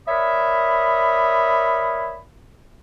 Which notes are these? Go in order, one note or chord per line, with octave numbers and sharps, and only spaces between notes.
A#4 C#5 D5 E5 B5 D#6